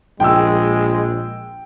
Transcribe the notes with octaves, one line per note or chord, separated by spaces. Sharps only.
A#1 G#3 G5 E6